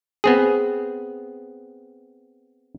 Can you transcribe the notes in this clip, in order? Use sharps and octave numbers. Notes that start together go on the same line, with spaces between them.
B3 C4 G#4